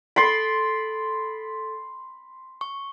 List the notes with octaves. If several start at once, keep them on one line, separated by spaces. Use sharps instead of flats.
A4 B5 C6 A6 D7
C#6